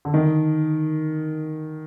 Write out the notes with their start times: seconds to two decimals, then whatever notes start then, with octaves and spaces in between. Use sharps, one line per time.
0.05 D3
0.14 D#3